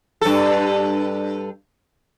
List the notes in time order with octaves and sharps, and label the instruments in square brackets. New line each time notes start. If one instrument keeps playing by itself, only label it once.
[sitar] G2 A4